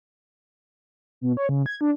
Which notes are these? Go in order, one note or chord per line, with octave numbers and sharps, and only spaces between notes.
B2
C#5
C#3
G#6
D4